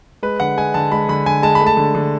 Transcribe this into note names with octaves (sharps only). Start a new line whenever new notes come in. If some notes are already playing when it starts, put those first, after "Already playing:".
G#3 B4
D3 F#5
G#3 G#5
D3 A5
G#3 B5
D3 B5
D3 G#5
G#3 A5
B5
A3
A5
D3
D3